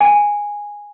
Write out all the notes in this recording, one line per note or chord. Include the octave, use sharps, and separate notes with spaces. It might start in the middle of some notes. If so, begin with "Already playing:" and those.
G#5